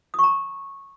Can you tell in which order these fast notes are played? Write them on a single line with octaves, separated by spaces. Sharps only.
D#6 C#6 A#5